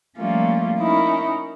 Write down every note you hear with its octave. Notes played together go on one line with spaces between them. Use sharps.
F3 G3 A3 A#3 C#4 F4
C#4 D#4 E4 A#4